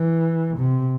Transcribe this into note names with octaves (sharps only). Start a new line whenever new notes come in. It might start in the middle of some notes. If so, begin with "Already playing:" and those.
Already playing: E3
C3